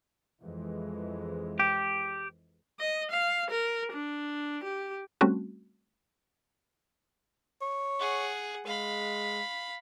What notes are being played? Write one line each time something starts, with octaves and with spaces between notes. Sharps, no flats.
F2 E3 G#3
G4
D#5
F5
A#4
D4
G4
G3 A3 C4 C#4 F#4
C#5
G#4 F#5
G#3 F5 B5